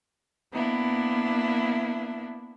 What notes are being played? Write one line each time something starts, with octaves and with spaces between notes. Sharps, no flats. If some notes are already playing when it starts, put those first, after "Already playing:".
A#3 B3 D4 E4